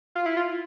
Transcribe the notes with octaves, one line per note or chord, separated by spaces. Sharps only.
F4
E4
F4